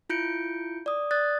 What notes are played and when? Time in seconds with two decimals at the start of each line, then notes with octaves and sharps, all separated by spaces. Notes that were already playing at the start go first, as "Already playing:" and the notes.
0.10 E4 F4 G6 C#7 D7
0.86 D5 D#6
1.11 D5 D#6 F#6 A6